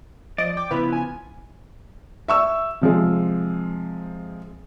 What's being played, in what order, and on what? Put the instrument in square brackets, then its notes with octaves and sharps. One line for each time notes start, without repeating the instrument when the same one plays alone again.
[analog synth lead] F3 [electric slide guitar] D5 [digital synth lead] D#5
[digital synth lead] G5 [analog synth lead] D6
[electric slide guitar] C#3 F3 B3 [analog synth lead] E4 [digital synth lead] B4
[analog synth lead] G#5
[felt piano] E5 C#6 E6
C3 F3 G#3